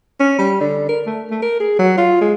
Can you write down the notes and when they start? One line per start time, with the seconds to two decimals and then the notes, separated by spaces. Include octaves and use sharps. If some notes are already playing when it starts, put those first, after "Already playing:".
0.20 C#4
0.39 G3
0.61 D3
0.89 A#4
1.06 A3
1.31 A3
1.42 A#4
1.60 G#4
1.79 F#3
1.98 F4
2.21 G#3